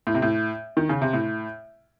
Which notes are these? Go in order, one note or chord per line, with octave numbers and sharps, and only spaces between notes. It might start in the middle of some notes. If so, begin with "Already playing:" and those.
A2
C3
A2
D#3
C#3
C3
A2